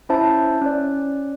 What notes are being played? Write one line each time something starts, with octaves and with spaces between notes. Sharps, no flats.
C#4 E4 C5 E5 A5
C#4 D5